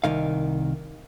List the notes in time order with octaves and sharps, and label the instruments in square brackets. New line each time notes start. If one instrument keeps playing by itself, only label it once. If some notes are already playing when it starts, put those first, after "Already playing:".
[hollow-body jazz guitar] C2 D#3 F5